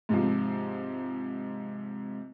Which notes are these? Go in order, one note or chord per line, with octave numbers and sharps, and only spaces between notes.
G#2 C3 F3